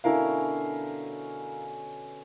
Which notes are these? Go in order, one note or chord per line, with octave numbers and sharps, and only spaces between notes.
B2 D3 C#4 E4 A#4 F5